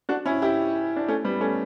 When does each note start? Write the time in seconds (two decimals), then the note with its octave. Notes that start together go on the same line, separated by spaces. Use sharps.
0.09 D4 F#4
0.26 C#4 E4
0.42 E4 G4
0.96 D4
1.08 A3 C#4
1.24 G3 B3
1.41 A3 C#4